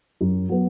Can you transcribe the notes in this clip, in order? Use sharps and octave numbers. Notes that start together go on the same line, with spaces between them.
F#2
F#3 B3